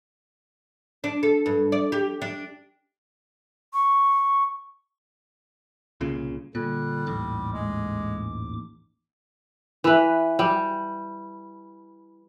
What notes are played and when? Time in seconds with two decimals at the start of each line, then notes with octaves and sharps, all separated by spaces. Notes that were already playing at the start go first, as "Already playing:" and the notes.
1.04 D4
1.23 A4
1.46 G2
1.72 D5
1.92 G4
2.22 D4
3.73 C#6
6.01 C2 A#2 C#3
6.55 A#2 D3 G3 F#6
7.07 A1 D#2 G#2 D6
7.53 G#3
9.84 E3 B4
10.39 G3